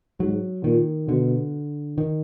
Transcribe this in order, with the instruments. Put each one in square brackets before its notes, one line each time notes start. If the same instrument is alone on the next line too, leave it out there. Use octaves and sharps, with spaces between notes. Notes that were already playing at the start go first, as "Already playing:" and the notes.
[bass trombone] G#2 [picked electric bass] F#3
[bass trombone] A#2 [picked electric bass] D#3
[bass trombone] B2 [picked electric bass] D3
[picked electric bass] D#3